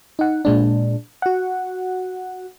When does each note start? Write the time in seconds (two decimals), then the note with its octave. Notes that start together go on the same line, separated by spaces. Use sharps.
0.19 D#4 F#5
0.45 A#2 G#3 D4
1.22 F#4 F#5